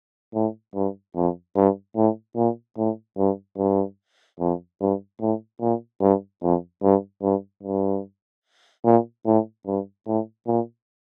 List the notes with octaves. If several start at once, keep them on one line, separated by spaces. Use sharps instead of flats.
A2
G2
F2
G2
A2
A#2
A2
G2
G2
F2
G2
A2
A#2
G2
F2
G2
G2
G2
A#2
A2
G2
A2
A#2